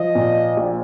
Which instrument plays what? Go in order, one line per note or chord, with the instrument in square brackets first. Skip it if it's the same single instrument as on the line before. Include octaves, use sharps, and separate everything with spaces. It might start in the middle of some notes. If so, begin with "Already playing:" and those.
Already playing: [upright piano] F3 [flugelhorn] D#5
[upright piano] A#2
A#1